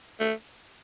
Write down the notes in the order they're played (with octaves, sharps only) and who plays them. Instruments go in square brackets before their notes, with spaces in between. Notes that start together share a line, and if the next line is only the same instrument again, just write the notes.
[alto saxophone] A3